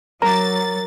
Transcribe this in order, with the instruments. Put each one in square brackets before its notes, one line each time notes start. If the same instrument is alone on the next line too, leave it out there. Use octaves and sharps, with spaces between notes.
[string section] F#3 A6 [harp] A#4 D6 [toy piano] A#5